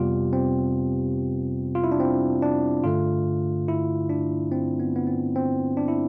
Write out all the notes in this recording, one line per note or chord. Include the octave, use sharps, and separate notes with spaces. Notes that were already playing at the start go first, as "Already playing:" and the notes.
Already playing: F2 C3 G3 B3 F4 G4
C4
F4
E4
D4
C4
D4
G2 D3 A3 F4
E4
D4
C4
B3
B3
C4
C4
D4
E4